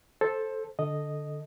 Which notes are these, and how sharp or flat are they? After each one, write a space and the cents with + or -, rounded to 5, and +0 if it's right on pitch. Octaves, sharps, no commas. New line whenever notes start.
A4 -5 C5 +15
D3 +0 A4 +0 D#5 -5